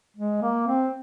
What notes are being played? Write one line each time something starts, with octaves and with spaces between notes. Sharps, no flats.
G#3
A#3
C4